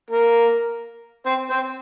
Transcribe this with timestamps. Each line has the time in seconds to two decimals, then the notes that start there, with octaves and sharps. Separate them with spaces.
0.10 A#3 A#4
1.26 C4 C5
1.50 C4 C5